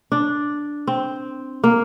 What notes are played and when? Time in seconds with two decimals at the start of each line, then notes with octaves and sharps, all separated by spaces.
0.12 D4
0.87 C4
1.64 A#3